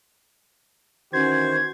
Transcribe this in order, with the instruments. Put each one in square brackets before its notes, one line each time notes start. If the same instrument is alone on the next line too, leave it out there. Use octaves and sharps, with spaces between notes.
[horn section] D#3 E3 F#4 [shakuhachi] C#4 [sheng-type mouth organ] C5 [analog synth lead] G#6